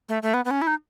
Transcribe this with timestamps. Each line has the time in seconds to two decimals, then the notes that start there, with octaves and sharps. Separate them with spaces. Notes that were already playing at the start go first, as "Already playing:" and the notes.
0.09 A3
0.22 A3
0.34 B3
0.45 B3
0.51 C#4
0.61 E4
0.67 D#4